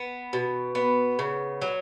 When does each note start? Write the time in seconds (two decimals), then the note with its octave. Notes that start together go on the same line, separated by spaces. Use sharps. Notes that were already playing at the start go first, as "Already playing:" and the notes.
Already playing: B3
0.33 B2
0.75 B3
1.19 C#3
1.62 F#3